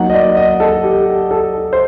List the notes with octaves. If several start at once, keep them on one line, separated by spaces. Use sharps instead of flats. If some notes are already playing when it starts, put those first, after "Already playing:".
Already playing: F#3 A#3 D#4 F#5
D#5
D5
D#5
A4
G4
A4
C5